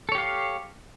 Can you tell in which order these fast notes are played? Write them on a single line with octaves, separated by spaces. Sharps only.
A4 C#5 G4 F5